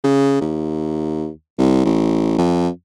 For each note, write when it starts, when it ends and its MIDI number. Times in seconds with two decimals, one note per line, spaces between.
0.04 0.37 49
0.41 1.30 39
1.58 1.81 36
1.85 2.34 33
2.38 2.68 41